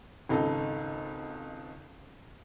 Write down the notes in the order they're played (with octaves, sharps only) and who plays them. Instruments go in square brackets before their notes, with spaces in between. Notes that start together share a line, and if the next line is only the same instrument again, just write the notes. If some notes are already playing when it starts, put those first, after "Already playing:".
[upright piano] G#1 C#2 D#4 A4